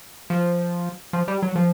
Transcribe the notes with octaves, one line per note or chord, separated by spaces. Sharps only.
F3
F3
G3
F#3
F3